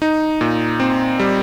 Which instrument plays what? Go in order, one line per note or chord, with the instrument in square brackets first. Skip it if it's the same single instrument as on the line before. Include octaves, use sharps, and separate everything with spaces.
[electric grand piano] D#4
A#2
C4
G3